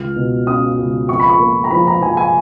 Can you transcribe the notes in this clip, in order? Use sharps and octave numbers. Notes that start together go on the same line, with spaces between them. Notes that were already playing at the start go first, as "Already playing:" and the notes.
Already playing: C#2 F6
B2
C#4 D#6
C#2
F2 C#6
B5
C#6
A#3
A#5
F3 B5
A#5
F3 G#5
G#5